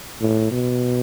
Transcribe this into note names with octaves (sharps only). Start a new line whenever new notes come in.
A2
B2